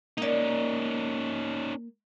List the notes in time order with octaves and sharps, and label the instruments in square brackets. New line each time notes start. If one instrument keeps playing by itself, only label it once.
[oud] A#3 D5 [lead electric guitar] C#4 D#4